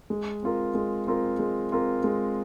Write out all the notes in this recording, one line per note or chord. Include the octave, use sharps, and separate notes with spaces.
G#3
C4 F4 A#4
G#3
C4 F4 A#4
G#3
C4 F4 A#4
G#3